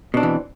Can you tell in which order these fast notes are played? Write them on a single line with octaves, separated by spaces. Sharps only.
B2 D4 C4 E3